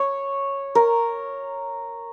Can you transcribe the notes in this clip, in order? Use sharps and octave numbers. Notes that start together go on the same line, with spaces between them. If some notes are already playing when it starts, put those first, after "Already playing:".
Already playing: C#5
A#4